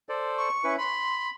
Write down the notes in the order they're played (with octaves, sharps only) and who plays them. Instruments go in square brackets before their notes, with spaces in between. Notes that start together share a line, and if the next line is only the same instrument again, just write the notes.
[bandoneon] A4 C5 D5
[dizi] C#6
[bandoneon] C#4 E4 B4
[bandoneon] B5 [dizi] C6